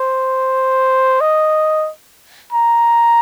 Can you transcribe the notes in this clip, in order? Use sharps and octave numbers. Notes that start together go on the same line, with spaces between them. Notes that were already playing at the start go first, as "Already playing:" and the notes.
Already playing: C5
D#5
A#5